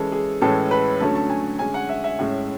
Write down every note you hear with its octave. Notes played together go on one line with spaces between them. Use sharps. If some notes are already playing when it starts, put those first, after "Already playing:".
Already playing: E3 G#3 C#4 A4
G#4
A2 E3 G#3 C#4 A4
B4
D3 F#3 A3 C#4 A5
A5
G#5
D3 G#3 C#4 G#5
F#5
E5
E5
A2 G#3 C#4